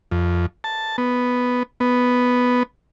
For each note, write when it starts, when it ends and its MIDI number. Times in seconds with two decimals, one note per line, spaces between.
0.11 0.46 41
0.64 0.97 81
0.98 1.63 59
1.80 2.63 59